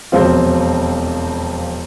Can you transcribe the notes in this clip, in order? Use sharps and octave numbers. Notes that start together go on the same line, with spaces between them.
E1 F2 C4 F4